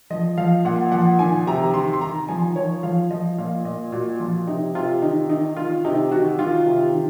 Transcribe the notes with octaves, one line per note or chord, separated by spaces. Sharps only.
F3 D#5
F3 F5
A#2 F#5
F3 F#5
D#3 G#5
C3 A#5
D#3 C6
C6
D#3 A#5
F3 G#5
F3 C#5
F3 F5
F3 D#5
A#2 F5
A#2 D#5
A#2 F#4
F3 F4
C3 D#4
C3 F4
D#3 D#4
D#3 D#4
D#3 F4
C3 D#4
D#3 F#4
D#3 F4
C3
D#3